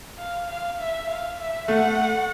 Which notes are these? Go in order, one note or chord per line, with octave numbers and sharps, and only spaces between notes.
F5
F5
E5
F5
E5
A3 F#5